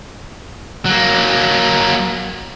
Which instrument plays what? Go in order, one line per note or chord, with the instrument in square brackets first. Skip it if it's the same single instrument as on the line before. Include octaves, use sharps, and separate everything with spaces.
[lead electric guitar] F#3 A#3